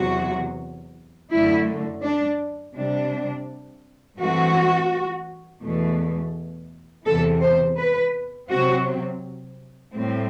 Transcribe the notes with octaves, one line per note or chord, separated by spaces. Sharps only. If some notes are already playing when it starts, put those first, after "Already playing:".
Already playing: E2 C3 F#3 F#4
F#2 D3 A3 E4
D4
C3 G3 D4
G2 E3 A3 C4 F#4
E2 B2 A3
E2 C3 E3 A4
C5
B4
C3 F#3 C4 F#4
A2 G3 C4